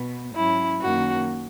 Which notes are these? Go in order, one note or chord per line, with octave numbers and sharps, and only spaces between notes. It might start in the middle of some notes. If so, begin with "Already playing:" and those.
Already playing: B2 B3
G#2 F#3 C#4 E4
F#2 D#3 A#3 C#4 F#4